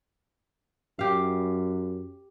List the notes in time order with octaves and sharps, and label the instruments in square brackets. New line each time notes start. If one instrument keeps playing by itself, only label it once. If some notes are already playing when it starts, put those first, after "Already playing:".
[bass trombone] F#2 [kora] G4 F5